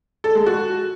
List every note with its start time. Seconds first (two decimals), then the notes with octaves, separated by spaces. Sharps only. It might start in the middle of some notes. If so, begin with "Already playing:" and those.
0.24 A4
0.35 G#3
0.46 F#4